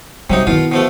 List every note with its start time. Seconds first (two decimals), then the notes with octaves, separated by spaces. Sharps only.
0.30 C3 F#3 G3 D#4
0.47 B2 D#3 E4 F4
0.72 B2 F3 A3